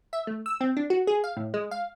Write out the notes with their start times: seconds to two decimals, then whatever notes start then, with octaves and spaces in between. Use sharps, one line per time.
0.13 E5
0.27 A3
0.46 E6
0.61 C4
0.77 D4
0.90 F#4
1.07 G#4
1.24 F5
1.37 A2
1.54 G#3
1.71 F5